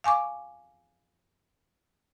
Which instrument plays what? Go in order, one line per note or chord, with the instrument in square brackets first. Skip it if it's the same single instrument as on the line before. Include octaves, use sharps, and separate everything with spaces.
[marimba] F5 G#5 C#6 D6